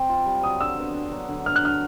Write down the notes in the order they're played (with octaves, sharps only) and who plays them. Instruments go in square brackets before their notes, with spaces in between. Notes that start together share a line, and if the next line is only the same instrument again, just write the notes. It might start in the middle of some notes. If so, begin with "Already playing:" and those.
Already playing: [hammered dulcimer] C4
F4
G3
[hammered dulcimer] F#3 [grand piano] D#6
[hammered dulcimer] D3 [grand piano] E6
[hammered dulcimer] B3
D4
F#3
D3
[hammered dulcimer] B3 [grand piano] F6
[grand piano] F#6
[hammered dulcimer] D4 [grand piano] F6